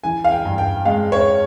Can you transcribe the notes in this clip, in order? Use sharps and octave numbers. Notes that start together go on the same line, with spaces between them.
E3 G#5
F5
G5
G2
G5
G#3 F5
C#5